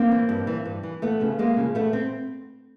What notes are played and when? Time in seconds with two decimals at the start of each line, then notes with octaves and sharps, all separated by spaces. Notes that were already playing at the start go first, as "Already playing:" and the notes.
Already playing: A#3 C4
0.11 E3
0.29 G2
0.47 E3
0.65 G2
0.83 E3
1.02 E2 A3 B3
1.20 C#3 F3
1.38 E2 G#3 A#3
1.56 C#3 F3
1.75 E2 A3 B3
1.93 C4